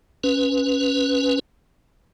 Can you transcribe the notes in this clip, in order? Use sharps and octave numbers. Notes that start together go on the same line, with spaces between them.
C#4 B4